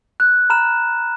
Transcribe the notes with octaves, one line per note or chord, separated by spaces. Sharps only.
F#6
A#5 B5 F6 E7